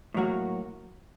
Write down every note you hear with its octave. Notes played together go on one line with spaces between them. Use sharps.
A2 F#3 A#3 F#4